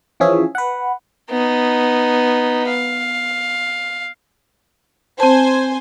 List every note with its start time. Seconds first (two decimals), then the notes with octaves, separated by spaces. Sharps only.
0.20 E3 F3 C#4 G#4 E5
0.55 B4 F#5
1.31 B3 D#4
2.69 F5
5.20 C4 C5 G#5 A5